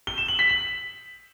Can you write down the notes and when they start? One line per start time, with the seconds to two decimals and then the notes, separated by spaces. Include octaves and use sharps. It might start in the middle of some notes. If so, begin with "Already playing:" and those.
0.07 G7
0.18 E7
0.28 F#7
0.39 B6
0.50 F#7